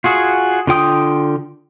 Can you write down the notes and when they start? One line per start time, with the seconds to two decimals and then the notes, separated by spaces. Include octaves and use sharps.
0.04 F4 F#4 G#4
0.67 D3 F4 G5 D#6